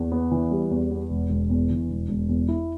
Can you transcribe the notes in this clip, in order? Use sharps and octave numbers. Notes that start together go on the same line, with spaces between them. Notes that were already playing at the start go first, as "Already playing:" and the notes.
Already playing: E2
B3
E3
G3
E2
B3
E1
E1
E2
E3
E1
E1
E2
E4